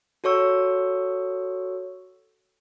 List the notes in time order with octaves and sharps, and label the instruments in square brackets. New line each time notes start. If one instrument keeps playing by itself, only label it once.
[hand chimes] F#4 A4 C#5 C#6 E6